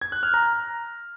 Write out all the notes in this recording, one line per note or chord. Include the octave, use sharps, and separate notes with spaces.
G#6
F#6
F6
A#5